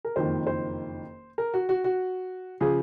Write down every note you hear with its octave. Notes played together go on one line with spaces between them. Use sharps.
A#4
F#1 F2 D#3 C5
C5
A#4
F#4
F#4
F#4
C#3 F3 G#4